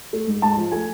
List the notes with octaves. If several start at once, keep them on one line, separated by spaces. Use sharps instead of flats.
A3
G#2
G#2 A5
F3
A3 G#5